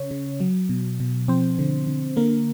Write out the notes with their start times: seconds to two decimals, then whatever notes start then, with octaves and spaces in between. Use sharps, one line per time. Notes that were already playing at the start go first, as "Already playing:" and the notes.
Already playing: C#3 C#4 C#5
0.11 C#3
0.40 F#3
0.69 B2
1.00 B2
1.28 F3 C4 C5
1.59 D3
1.87 D3
2.17 D3 A#3 A#4